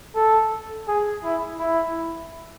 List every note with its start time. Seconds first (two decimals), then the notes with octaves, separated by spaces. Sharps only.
0.15 A4
0.88 G#4
1.24 E4
1.59 E4